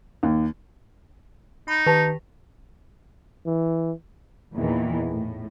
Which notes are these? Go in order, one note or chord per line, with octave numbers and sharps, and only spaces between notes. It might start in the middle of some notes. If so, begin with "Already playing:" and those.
D#2
D#4 B5
D#3 G4 B4 A5 A#6
E3
E2 A#2 D#3 E3
A2